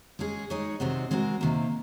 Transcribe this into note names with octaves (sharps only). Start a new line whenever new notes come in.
G#3 C#4 G#4
G#3 D#4 G#4 C#5
C3 D#3 G#3 C4 F#4
G#3 C4 F#4 A#4
C3 D#3 A#3